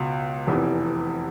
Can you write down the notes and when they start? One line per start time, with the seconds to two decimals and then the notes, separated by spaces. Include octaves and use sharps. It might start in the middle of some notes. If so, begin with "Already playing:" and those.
Already playing: C#2 B2
0.47 F1 E2 C3 E3